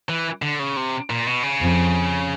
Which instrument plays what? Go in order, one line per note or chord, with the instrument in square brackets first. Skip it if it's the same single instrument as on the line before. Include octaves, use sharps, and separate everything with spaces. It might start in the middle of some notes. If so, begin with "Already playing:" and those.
[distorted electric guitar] E3
D3
C#3
C3
A#2
B2
C#3
[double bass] F2